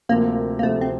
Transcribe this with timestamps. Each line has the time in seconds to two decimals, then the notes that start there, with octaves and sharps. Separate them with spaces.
0.09 D2 C3 F3 A#3
0.59 A#3
0.63 D2 C3 F3 A3
0.81 C4